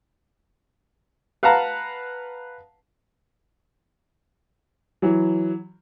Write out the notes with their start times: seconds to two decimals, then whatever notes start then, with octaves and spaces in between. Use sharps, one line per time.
1.43 B4 F5 F#5 A5 A#5
5.02 E3 F#3